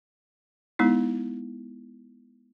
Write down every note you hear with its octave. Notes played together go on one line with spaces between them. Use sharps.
G#3 B3 D#4 E4